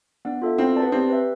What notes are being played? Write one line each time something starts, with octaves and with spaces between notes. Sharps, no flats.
B3 D4
F4 A4 E5
C4 E4
B4 D5 A5
B3
C4 G4
B4 E5